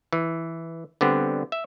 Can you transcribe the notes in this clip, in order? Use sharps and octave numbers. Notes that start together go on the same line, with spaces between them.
E3
D3 G3 B3 C4
E5